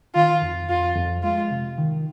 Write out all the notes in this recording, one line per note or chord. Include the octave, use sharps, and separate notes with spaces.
D#3 F4
F2
F2 F4
F2
G#3 F4
C3
D#3